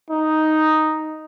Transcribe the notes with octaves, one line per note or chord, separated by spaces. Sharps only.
D#4